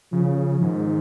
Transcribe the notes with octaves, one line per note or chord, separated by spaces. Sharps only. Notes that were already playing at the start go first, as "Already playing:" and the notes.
C#3 F3
G#2 D#3